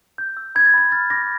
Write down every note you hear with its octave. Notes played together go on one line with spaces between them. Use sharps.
G6
E6
B5 G#6
A6
B5 G#6
F6 A6
D6 A#6